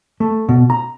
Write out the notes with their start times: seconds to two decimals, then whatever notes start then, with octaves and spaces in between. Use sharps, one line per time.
0.20 A3
0.49 B2
0.70 A#5